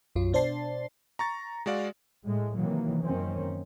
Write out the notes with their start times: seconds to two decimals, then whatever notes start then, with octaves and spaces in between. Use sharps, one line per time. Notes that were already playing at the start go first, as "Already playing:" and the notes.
0.15 B1 F#2 F#3 F4
0.33 B2 D4 C5 D5 A5 C7
1.19 A#5 C#6 A6
1.66 G#3 F#4 D5 F5
2.23 A2 G#3 A3
2.56 C3 D#3 E3 F#3 A#3
3.03 F#2 D#3 A#3 C4 C#4